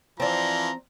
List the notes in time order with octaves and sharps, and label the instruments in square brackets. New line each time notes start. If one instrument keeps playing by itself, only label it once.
[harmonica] E3 F3 [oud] C4 D5 [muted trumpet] A#5